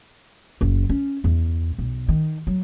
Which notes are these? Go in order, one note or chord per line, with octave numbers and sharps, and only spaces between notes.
F#1
C#4
E2
B1
D#3
F#3